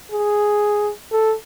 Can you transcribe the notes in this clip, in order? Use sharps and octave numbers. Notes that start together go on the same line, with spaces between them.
G#4
A4